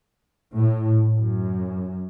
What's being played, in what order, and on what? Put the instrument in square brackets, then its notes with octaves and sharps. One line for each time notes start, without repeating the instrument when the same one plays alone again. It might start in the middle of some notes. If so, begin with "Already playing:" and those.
[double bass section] A2
F#2